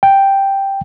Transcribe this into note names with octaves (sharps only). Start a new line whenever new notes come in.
G5